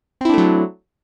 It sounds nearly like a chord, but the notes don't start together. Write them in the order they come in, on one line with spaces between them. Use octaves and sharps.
C4 E4 D4 A3 F#3